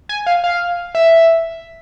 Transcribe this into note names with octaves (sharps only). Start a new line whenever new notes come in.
G#5
F5
F5
E5